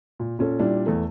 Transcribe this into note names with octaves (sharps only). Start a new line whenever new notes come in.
A#2
A#2 C#4 A4
A#2 G3 D4 E4
E2 E3 A3